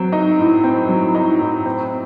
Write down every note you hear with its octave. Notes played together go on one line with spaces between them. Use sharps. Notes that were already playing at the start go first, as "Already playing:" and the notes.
Already playing: F#3 C4
D#4
A2
C4
F#3
D#4
A2
C4